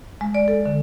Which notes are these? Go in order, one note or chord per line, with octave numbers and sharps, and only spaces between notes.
G#3
D5
A4
D3